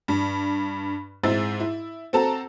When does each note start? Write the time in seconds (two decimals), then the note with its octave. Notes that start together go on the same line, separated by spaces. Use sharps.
0.08 G2
1.24 G#2 G#3 C4 E4 E6 A6
1.60 E4
2.13 C4 F#4 A4 A5 A#5